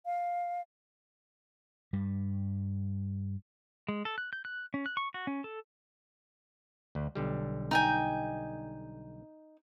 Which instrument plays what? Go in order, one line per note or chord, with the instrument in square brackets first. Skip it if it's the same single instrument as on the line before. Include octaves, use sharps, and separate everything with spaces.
[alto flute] F5
[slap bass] G2 G3
[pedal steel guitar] G#3
A4
F#6
G6
F#6
C#4
F#6
C#6
F#4
C#4
A4
[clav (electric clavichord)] D2
B1 D3 G3
[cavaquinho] D#4 G5 G#5